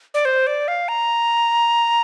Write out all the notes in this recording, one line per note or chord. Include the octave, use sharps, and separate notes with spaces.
D5
C5
D5
F5
A#5